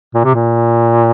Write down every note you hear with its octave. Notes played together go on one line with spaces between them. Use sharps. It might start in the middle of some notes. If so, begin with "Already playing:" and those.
A#2
C3
A#2